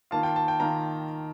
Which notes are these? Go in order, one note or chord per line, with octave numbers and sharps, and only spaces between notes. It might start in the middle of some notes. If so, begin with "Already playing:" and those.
D#3 A#3 F4 A5
G5
A5
G5
D#3 A#3 F4 A#5